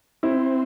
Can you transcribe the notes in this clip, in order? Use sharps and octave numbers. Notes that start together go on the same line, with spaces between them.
C4 E4